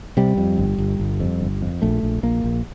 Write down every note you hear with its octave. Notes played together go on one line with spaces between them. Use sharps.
C3 G3
F2
G1
G1
G1
F2
G1
F2
A#1 A3
A#1
A#1 A#3
A#1